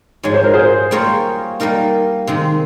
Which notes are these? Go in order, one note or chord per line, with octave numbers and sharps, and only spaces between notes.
G#2 F3 G#3 C#5
C5
A#4
G#4 C5
G3 A#3 F4 A#4 C#5
G3 A#3 D#4 A#4
C3 D#3 G#3